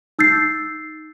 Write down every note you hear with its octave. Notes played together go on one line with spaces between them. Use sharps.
D#4 E6 G6 A6 C7